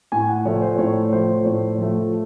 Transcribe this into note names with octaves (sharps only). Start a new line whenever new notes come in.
A2 G#5
F#5
F3 A3 C#5
C5
A2 C#5
F3 A3 C5
A2 C#5
F3 A3